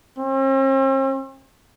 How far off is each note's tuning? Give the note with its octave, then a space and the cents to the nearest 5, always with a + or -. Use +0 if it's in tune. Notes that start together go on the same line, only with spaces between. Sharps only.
C4 +45